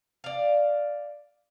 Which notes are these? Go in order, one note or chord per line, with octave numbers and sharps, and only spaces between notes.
D5 F5